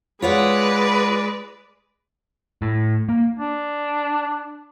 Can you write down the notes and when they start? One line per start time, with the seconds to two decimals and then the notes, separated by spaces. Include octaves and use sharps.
0.22 G#3 F4 B4 C#5 D5 F#5
2.62 A2
3.09 A#3
3.39 D4